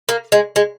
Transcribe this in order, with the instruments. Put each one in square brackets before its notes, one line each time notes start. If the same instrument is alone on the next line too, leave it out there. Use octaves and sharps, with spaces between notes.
[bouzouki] A#3
G#3
G#3